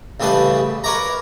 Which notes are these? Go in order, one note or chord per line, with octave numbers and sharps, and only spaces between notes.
A1 C#3 G3 B3 B4 A5
A#4 B4 C#5 D5 A#5